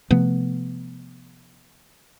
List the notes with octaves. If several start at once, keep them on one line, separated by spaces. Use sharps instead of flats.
C3 F3 A3 B3